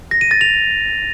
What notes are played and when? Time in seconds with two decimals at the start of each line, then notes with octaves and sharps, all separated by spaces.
0.11 A#6
0.21 D#7
0.31 A6
0.41 F7